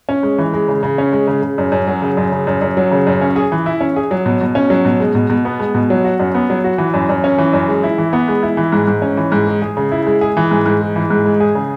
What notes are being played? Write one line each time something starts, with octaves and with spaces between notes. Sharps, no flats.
C#4
G#3
E3
G#3
C#3
C#3
C#4
G#3
C#3
C#3
F#2
F#2
F#3
C#3
F#2
C#3
F#2
F#2
F#3
C#3
F#2
C#4
G#4
E3
E4
C#4
G#4
F#3
B2
B2
C#4
F#3
B2
G#3
B2
B2
B3
G#3
B2
F#3
F#4
F#2
B3
F#3
F#4
E3
F#2
F#2
C#4
E3
F#2
G#3
E4
E3
B3
G#3
E4
E3
G#2
G#2
C#4
E3
G#2
G#3
G#4
C#3
E4
G#3
G#4
E3
G#2
G#2
G#3
E3
G#2
G#3
G#4
C#3